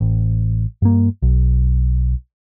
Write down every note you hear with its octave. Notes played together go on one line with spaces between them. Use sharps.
A1
G2 A#3
B1